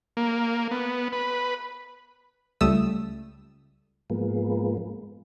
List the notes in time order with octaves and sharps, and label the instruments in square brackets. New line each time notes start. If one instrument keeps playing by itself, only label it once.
[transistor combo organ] A#3
B3
B4
[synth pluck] C#2 G3 A3 D#6 E6
[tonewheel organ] G#2 F3 G#3 A#3 B3